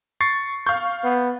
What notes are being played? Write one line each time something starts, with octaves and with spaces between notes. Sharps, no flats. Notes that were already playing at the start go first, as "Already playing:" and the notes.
C#6 A6 C7
F5 C#6 G6
B3